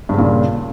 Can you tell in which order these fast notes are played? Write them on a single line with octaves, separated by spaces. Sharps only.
G2 C#3 A#2